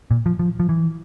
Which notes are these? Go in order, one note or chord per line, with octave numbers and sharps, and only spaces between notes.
A#2
F3
F3
F3
E3